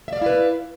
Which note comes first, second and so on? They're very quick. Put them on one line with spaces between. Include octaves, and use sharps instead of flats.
E5 D5 F5 E4 B4